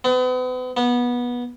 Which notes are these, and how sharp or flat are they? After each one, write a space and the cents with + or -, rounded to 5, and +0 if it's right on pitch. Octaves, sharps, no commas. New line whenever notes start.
B3 +40
B3 -20